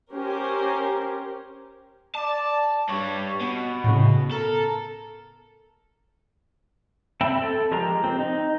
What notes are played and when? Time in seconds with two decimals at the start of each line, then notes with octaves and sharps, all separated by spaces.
0.11 C#4 G4 A#4 C5
2.15 D5 A5
2.89 G2 G3 C#5
3.41 B2 F#4
3.84 A2 C#3
4.31 A4 A#4
7.21 C4 E5 G5 A5 B5
7.42 A4
7.71 F3 G#3 G4 A#4 A#5
8.04 C4
8.19 D#4